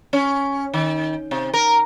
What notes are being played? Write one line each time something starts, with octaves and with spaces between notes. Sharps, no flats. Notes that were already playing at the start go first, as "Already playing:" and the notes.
C#4
D#3
C3
A#4